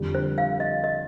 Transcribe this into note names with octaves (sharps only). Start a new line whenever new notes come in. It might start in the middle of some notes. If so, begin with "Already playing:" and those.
Already playing: F2 D3 G3
C5
F5
D#5
D#5